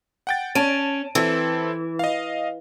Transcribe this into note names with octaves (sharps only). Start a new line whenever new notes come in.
F#5 G5 A6
C#4 A5 D7 D#7
E3 C4 E4 A4
D#5 F5